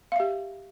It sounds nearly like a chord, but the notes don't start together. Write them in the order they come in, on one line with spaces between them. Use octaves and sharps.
F5 E5 G4